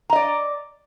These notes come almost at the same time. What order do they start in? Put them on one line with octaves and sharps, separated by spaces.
A#5 D#5 D5